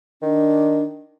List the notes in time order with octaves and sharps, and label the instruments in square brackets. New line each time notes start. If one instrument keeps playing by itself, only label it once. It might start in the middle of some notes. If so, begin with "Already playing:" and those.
[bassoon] D#3 [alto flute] D4